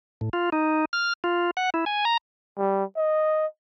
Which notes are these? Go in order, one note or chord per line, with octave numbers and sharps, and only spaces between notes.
A2
F4
D#4
F6
F4
F#5
E4
G#5
A#5
G3
D#5